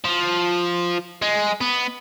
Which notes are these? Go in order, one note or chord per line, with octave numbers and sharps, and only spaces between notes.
F3
G#3
B3